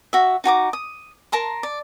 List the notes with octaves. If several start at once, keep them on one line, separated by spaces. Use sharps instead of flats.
F#4 E5
D#4 F#4 A#5 D6
D#6
A#4 A5 A#5 C6
D5